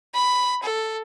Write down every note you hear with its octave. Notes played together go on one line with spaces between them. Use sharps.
B5
A4